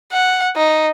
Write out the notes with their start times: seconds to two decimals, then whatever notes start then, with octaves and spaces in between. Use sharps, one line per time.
0.12 F#5
0.56 D#4